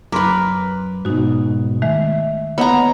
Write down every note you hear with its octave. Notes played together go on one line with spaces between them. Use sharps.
F#2 A#4 B4 C6 D6
G#2 B2 D#4 F#4
D#3 G#3 A3 E5
B3 C#5 D#5 F#5 A#5